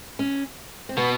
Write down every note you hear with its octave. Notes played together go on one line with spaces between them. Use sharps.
C#4
C4
B2 B3